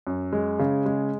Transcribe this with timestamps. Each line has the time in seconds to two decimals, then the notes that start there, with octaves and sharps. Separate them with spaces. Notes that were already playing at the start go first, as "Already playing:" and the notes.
0.07 F#2
0.33 G#3
0.59 C#3
0.86 G#3